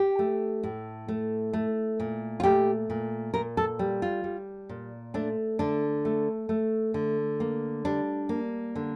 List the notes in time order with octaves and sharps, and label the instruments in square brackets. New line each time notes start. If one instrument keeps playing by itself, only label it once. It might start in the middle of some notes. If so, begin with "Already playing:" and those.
Already playing: [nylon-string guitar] G4
A3
A2
A3
A3
A#2
F4
A3 G4
A#2
A#2 A#4
A4
G3
F4
G3
A#2
A3 D4
D3 D4
A3
A3
D3
A#3
G3 D4
A#3
D3